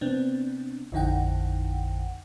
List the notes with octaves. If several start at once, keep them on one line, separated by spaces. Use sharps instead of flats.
C3 B3 C4 D4
A1 F2 D3 D#4 F#5 G5